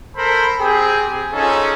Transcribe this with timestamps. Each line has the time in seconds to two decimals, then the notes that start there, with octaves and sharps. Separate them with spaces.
0.16 A4 A#4 C5 B5
0.59 C4 G4 G#4
1.32 C#4 D#4 F4 G#4 A4